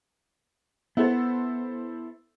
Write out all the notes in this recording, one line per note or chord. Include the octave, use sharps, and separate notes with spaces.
B3 E4 A4 C5